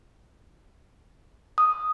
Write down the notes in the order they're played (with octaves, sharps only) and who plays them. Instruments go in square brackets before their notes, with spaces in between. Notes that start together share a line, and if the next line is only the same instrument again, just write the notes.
[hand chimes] D#6